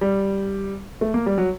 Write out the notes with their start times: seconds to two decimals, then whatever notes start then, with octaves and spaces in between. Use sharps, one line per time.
0.01 G3
1.01 A3
1.14 A#3
1.26 G3
1.38 F#3